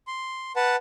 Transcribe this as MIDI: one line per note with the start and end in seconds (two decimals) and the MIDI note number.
0.07 0.52 84
0.56 0.76 71
0.56 0.76 78
0.56 0.76 81